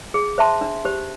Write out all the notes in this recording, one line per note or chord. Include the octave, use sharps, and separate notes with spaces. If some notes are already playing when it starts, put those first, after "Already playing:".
G#4
C5 E5 A5 C6
D4
G4 C5